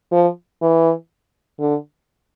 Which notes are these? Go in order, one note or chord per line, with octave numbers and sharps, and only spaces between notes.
F3
E3
D3